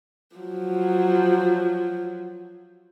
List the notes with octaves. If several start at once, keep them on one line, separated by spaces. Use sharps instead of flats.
F3 F#3